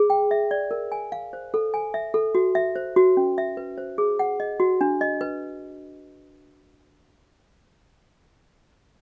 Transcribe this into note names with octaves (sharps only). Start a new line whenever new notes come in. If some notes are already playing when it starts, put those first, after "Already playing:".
Already playing: G#4
G5
E5
D5
A#4
G#5
F5
C5
A4
G#5
E5
A4
F#4
E5
C5
F#4
C#4
E5
B4
C5
G#4
F#5
D#5
F#4
D4
D#5
B4